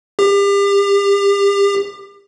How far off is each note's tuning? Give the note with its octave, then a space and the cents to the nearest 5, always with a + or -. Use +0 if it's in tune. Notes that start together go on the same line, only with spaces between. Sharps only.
G4 +35